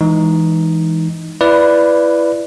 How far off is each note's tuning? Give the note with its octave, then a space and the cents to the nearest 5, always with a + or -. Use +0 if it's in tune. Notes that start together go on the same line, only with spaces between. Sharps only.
E3 +0 G#3 +0 D#4 +0
E4 +20 B4 +0 D5 +0